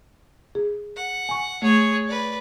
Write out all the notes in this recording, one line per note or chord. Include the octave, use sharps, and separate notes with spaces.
G#4
F#5
G#5 C#6
A3 G#4 C#5
B4 D5